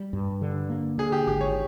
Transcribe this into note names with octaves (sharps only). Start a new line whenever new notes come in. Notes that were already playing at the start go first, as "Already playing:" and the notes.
Already playing: G3
G2
D3
A#3
D3 G#4
G4
G#1 G4
C#5